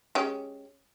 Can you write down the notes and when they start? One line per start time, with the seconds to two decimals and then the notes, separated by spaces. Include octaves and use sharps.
0.15 G#3 C#4 G4